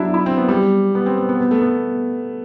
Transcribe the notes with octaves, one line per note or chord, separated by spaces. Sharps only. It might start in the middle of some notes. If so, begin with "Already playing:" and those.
Already playing: F#3 D4 E4
E4
C4
B3
G3
B3
C4
B3
B3
B3
A3
B3